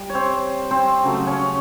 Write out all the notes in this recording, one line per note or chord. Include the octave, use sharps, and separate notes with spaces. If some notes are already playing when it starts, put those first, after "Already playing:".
Already playing: G3
C#5
C4 C5
C4 C5
C#3 F#3 A3
C#4 C#5